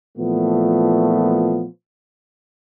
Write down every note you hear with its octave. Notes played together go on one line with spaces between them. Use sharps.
A#2 E3 F3 A3 B3